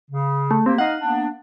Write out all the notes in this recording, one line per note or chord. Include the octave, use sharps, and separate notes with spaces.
C#3
A3
A#3 C4 G4
D#4 D#5 F5 F#5
A#3 B3 D4